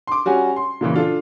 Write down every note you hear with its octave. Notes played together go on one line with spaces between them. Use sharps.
C6 D6
G3 C#4 F#4 G#5
C6
A#2 C#3 E3
D4 F4 A4